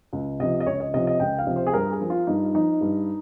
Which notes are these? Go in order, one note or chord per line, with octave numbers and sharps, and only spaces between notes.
C#2
C3 F3 D#5
D#5
C#2 C#5
D#5
C3 F3 D#5
D#5
C#2 G5
F5
C3 F3
C5
G#4
G2 A#4
G#4
F3
F4
G2 D#4
F3 D#4
G2